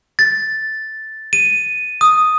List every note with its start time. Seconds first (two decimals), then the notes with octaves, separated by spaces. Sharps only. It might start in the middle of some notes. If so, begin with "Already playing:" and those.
0.19 A6
1.33 D#7
2.01 D#6